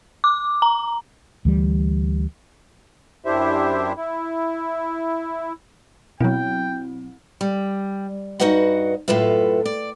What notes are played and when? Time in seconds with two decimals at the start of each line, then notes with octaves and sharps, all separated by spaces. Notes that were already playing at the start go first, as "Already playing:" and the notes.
0.24 D6
0.62 A#5
1.45 D2 E3 G3
3.25 F#2 D4 E4 G4 C5 E5
3.97 E4
6.20 B2 F#3 C4 E4 G5
7.41 G3
8.40 G2 D#4 F#4 B4 D#5 F#5
9.08 F#2 A2 F4 A4 B4 E5
9.65 D5